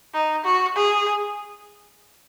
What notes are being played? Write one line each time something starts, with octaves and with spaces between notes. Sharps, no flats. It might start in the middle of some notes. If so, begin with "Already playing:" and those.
D#4
F#4
G#4